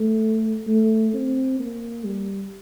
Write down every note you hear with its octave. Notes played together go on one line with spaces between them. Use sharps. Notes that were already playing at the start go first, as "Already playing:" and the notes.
Already playing: A3
A3
C4
A#3
G3